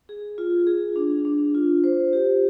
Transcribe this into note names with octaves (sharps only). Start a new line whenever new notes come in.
G#4
F4
G#4
D4
D4
F4
C5
G4